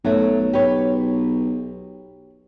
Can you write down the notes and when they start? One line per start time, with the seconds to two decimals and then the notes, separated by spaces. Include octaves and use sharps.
0.05 B1 F#3 A3
0.53 G4 B4 C#5